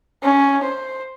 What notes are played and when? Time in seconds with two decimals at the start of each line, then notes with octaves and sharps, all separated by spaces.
0.23 C#4
0.63 C5